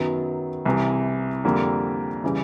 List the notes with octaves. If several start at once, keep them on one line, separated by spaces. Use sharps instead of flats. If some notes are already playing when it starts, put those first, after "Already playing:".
Already playing: F#2 D#3 F#3 B3
C2 C3 E3
F2 D3 G3 A#3
C#3 E3 G3